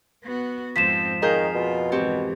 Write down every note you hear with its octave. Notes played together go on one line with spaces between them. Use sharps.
B3 F#4
F2 G#2 F3 C4 B6 E7
D#3 G#4 A#4 F5 G6
B2 F4
G#2 E3 C4 G4 C#5